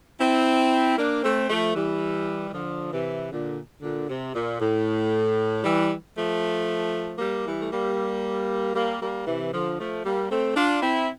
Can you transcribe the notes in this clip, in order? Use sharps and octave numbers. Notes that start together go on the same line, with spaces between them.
C4 E4
A#3 D4
A3 C4
F3 A3
E3 G3
E3
D3 F3
C3 E3
A#2 D3
A#2 D3
C3
A#2
A2
E3 G3
F3 A3
G3 A#3
E3 G3
A3
G3 A#3
G3 A#3
G3 A#3
C3 E3
D3 F3
F3 A3
G3 A#3
A3 C4
D4 F4
C4 E4